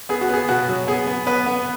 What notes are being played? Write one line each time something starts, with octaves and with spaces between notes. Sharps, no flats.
B3 G#4
F#4
B3 G#4
B2 F#4
F#3
B3 G#4
B3
B3 B4
B3